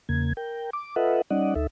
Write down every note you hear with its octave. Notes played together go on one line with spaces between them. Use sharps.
E2 C#3 A#3 G#6
A#4 G5
D6
F4 A4 B4 D#5 E5 F#5
G3 C#4 D#4 D5 D#5 F#5
D2 D#4 A4 E5